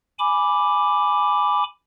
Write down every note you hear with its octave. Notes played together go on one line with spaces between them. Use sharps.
G#5 B5 D6